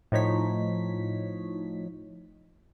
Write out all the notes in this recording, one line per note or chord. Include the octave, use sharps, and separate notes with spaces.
A2 F3 D#4 C#5 B6